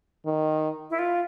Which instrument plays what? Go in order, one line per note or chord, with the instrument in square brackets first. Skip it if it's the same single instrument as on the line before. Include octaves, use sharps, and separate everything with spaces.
[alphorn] D#3
[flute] E4
F4